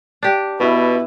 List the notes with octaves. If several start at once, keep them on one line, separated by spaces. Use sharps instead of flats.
D4 G4
B2 B3 E4 B4